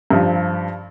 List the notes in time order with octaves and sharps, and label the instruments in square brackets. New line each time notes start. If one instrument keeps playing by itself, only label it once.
[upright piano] G2 F3